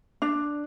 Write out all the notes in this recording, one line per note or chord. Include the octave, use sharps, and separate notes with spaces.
D4